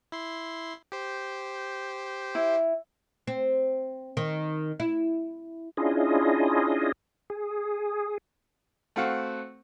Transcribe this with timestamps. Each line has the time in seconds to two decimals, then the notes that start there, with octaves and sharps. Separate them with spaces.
0.12 E4 C6
0.92 G4 C5
2.35 E4
3.27 C4
4.17 D#3
4.80 E4
5.77 C#4 D4 E4 F4 G#4 D#5
7.30 G#4
8.96 A3 C4 F#4 F5 F#5